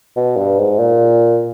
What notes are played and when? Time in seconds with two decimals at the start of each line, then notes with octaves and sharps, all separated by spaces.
0.16 B2
0.37 G2
0.59 G#2
0.79 A#2